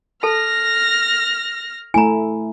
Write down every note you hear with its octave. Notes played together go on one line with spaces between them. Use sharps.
A4 A5 F6 A#6
A3 E4 G#5 A#5